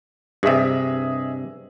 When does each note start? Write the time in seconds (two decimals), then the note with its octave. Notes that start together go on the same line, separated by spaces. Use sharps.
0.43 G2 C3 G#4 D#5 E5